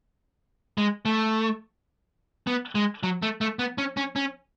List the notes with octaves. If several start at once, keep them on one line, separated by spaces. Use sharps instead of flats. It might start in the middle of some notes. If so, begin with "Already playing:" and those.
G#3
A3
B3
G#3
F#3
A3
A3
B3
C#4
C#4
C#4